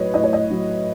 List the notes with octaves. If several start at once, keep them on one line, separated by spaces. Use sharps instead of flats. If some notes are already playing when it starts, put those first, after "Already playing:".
Already playing: A2 F#3 B4 C#5 D#5
A2 D#5
C#5
D#5
F#3